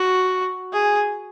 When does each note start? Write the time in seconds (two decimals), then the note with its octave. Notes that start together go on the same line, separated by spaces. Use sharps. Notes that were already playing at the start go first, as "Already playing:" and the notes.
Already playing: F#4
0.73 G#4